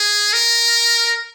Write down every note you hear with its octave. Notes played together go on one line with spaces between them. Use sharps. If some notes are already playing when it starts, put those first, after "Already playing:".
Already playing: G#4
A#4